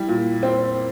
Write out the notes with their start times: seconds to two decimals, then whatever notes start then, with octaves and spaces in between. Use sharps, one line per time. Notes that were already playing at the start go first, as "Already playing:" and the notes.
Already playing: G3 E4
0.08 A#2
0.43 C4